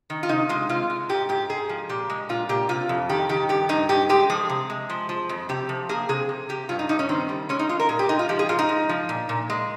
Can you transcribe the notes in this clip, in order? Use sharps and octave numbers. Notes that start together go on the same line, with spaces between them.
D#3
F4
C3 D#4
G#3 F4
C3 F4
G#3
G#2 G4
G#2 G4
G#2 G#4
F3
A#2 G4
G#3
A#2 F4
A#2 G4
C3 F4
F2
D#3 G4
D#3 G4
G2 G4
G2 D#4
G2 G4
G#3 G4
F3 G#4
C3
G#3
F3
F3
F2
C3 G4
F3
A#3 G#4
C3 G#4
C3
C3 G4
G2 F4
D#4
G2 D#4
C#4
D#3 C4
G3
G#3 C#4
D#4
G#3 F4
A#4
A#2 G#4
G4
G#3 D#4
F4
F3 G4
G#4
G#2 F4
D#4
G#2
F3
A#2
A#2
G#3